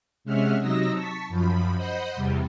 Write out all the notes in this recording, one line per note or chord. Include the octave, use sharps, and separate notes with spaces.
C3 G#3 C#4 E5 F#5 F6
C3 F#3 D#4 D#5 E6 A#6
A5 C#6 B6
F#2 F3 B5
C5 D#5 F#5 B5 G6
E2 C3 G3